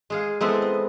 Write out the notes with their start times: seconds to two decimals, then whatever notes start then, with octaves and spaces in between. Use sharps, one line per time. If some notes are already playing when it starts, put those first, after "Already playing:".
0.10 G#3 G#4 F5
0.41 G#3 B3 C4 E4 A4
0.62 D#5